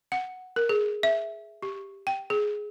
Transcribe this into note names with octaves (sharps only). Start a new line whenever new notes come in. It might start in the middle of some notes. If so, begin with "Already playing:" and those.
F#5
A#4
G#4
E5
G4
G5
G#4